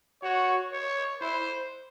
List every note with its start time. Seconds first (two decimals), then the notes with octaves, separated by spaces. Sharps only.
0.22 F#4 C#5
0.72 C#5
1.21 E4 C5